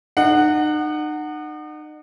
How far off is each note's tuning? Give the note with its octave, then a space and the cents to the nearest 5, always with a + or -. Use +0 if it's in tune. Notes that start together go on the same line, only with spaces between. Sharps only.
D#4 -40 F#5 +0